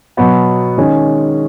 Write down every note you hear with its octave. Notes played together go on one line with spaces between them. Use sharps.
B2 F#3 B3 F#4
D#3 G#3 C#4 G#4